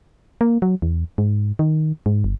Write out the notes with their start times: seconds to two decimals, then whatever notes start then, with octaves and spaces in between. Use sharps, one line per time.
0.41 A#3
0.62 F#3
0.82 E2
1.18 G#2
1.59 D#3
2.06 G#2
2.24 G1